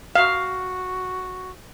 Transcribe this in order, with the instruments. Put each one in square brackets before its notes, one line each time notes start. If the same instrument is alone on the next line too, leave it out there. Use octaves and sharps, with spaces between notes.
[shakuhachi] F#4 [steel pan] F5